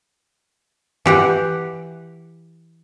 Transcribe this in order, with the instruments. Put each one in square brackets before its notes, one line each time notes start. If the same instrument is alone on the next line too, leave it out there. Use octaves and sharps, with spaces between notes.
[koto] E3 G4 F#5